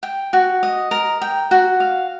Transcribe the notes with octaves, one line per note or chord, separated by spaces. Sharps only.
G5
F#4
D#5
A#4
G5
F#4
F5